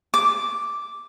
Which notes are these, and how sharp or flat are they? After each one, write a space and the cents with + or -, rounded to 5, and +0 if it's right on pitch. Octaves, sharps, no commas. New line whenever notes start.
D6 -5